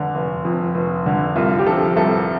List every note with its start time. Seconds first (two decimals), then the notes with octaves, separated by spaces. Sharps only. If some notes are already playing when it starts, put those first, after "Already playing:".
Already playing: F1 D3
0.15 F1
0.45 F2
0.75 F1
1.06 D3
1.36 C2 F4
1.59 G4
1.67 F3 A4
1.97 C2 A4